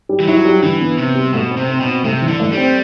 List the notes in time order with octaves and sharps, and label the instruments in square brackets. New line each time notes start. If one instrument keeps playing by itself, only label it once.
[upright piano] G3
[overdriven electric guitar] E3
[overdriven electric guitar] F#3 [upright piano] E4
[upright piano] G3
[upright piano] D3 [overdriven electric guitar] E3
[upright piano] B3
[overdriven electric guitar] C3 [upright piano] B3
[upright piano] G3
[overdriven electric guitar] B2 [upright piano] A3
[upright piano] C4
[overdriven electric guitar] C3
[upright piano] C4
[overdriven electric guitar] B2
[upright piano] C4
[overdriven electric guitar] C3 [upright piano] A3
[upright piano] E3
[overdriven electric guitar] D3
[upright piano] A3
[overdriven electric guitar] G3
[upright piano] C4